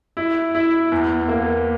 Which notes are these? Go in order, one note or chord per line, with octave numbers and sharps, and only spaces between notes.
E4
E4
E2
A#3